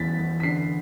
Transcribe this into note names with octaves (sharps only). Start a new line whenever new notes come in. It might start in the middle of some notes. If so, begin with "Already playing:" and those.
Already playing: E2 B3 A6 B6
E2
B6
D3 C7